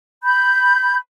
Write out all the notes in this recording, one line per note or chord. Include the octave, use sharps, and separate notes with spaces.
B5 G6